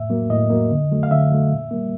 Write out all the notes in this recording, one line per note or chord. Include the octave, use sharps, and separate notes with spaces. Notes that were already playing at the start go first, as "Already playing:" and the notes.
Already playing: A2 E5
F#3 A#3
A2 D#5
F#3 A#3
D3
F#3 A3
F5
D3 E5
F#3 A3
A#2
G3 A#3